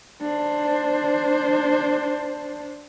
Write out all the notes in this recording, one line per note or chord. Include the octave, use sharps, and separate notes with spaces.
D4 C5